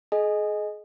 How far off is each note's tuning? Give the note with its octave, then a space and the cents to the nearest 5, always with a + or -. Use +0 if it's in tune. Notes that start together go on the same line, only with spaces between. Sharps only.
G#4 +35 D#5 +0 G#5 +0